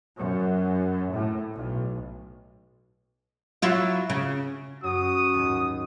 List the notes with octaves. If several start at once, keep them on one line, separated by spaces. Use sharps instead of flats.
F#2
A2
B1
F#3 E4 F4
C#3
F#2 F#4 D#6
D#2 G#2